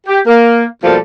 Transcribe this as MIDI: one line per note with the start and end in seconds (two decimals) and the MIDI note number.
0.07 0.19 67
0.27 0.63 58
0.83 0.97 47
0.83 0.97 53
0.83 0.97 55
0.83 0.97 58
0.83 0.97 69